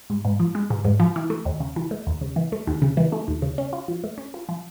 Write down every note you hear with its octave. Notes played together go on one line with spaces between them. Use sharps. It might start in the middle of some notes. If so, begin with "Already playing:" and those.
G#2
G#2
F3
G#3
G#2
G#2
F3
E3
A3
D#2
C#3
E3
A3
D#2
C#3
E3
A3
D#2
C#3
E3
A3
D#2
C#3
C#4
F4
F3
A3
C#4
F4
F3